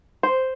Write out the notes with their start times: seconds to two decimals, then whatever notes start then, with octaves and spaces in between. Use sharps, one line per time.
0.23 C5